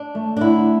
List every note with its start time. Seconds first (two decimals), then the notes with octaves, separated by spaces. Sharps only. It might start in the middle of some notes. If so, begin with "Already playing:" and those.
Already playing: D4
0.15 A3
0.37 D4
0.41 D3 E4